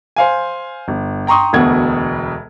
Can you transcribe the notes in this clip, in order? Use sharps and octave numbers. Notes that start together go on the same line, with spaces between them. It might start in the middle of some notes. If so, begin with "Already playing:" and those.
C5 F5 G#5
G1
G5 A#5 C6 C#6 D#6
E1 D2 B2 F#5 G#6